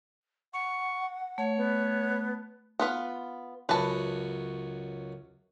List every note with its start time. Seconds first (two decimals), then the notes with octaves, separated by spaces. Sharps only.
0.53 F#5 C#6
1.38 A3 C#5
1.57 B3
2.80 B3 F4 B4
3.69 C#2 F#2 F#4 B4 A5